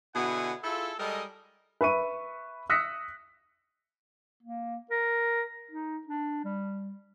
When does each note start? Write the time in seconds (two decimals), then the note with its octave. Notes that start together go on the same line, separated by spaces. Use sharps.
0.15 B2 D3 E4 G#4 F#5 G#5
0.64 E4 F4 G#4 A4
0.99 G3 G#3 A4 A#4 D#5
1.81 B4 E5 C#6 D#7
2.70 D#6 E6 F#6 A#6 B6 C#7
4.43 A#3
4.91 A#4
5.71 D#4
6.07 D4
6.44 G3